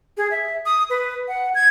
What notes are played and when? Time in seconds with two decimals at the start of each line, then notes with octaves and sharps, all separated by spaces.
0.17 G#4
0.31 E5
0.66 D#6
0.90 B4
1.28 F#5
1.55 G#6